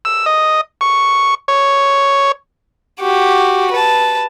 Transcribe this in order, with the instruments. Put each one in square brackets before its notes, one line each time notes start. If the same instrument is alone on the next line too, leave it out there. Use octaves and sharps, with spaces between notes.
[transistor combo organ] E6
D#5
C#6
C#5
[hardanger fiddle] F#4 G4
B4 A5